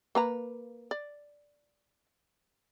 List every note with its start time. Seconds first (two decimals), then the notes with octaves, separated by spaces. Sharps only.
0.15 A#3 B4 A#5
0.91 D5